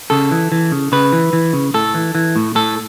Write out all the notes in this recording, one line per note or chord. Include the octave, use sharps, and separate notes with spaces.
C#3 A4
E3
E3
C#3
C#3 B4
E3
E3
C#3
A2 A4
E3
E3
A2
A2 A4